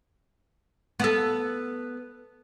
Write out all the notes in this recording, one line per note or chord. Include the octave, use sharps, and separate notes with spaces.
B3 A4